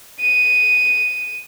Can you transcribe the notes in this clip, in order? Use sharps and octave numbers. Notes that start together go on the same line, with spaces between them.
D#7